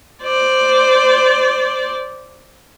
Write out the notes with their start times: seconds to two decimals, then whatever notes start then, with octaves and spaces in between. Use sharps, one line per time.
0.23 C5 D5